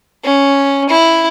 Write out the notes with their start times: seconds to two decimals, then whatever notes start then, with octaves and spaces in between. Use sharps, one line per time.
0.24 C#4
0.89 E4